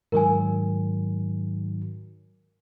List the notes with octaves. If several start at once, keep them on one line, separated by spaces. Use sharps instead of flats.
G#2 D#3 F#3 A#4 G#5